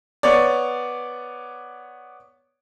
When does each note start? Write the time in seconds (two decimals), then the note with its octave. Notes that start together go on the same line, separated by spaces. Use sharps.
0.23 B3 C#5 D5